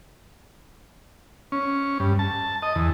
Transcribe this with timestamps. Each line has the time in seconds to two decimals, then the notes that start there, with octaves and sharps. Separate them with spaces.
1.52 C#4
2.00 G2
2.19 A5
2.63 D#5
2.76 E2